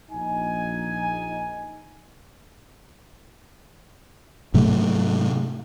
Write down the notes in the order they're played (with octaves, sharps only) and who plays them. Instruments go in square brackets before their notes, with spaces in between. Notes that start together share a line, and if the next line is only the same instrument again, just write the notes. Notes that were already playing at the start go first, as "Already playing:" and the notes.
[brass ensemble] A#1 D#4 G#5
[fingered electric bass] G#2 C3 F#3 A3